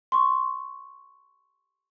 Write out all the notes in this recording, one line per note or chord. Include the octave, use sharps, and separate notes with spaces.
C6 C#6